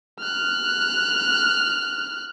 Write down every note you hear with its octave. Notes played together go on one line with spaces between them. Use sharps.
F6 F#6